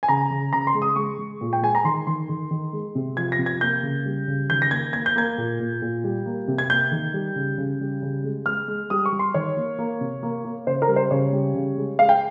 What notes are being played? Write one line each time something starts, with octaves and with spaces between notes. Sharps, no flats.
G#5
C#3 A#5
C#3
C#3 A#5
C6
G#3
D#6
G#3 C#6
G#3
A#2
G5
G#3 G#5
A#5
D#3 C6
D#3 C6
D#3
D#3
G#3
C3
F3 G#6
A#6
C3
G#6
A#3 G6
C#3
G3
C#3
D#3 G6
A#6
A#3 G#6
A#3 G#6
G6
A#3 G#6
A#2
A#2
A#2
G3
A#3
C3
G#6
A#3 G6
D#3
G3
C#3
C#3
G3
C#3
G#3
G#3 F6
G#3
G3 D#6
C#6
G3
C6
D#3 C#5
A#3
A#3
C3
A#3
A#3
C#3 C5
A#4
G3
C5
C#3 C#5
G3
C#3
G#3
G#3 F5
G5